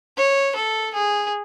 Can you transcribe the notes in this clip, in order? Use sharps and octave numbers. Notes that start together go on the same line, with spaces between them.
C#5
A4
G#4